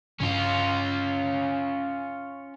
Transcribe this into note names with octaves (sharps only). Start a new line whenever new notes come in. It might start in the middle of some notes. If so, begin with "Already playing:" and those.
G2 C#3 C#4 D4 F4